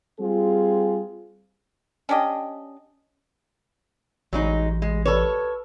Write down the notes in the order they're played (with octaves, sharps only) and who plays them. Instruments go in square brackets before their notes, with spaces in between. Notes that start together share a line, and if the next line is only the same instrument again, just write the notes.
[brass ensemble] G3 C4 F4 G#4
[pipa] C#4 D4 G4 D#5
[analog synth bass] A1 [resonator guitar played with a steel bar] F#3 G#3 D#4
[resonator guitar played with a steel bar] G#3
[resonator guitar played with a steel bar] A4 C#5 [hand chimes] B4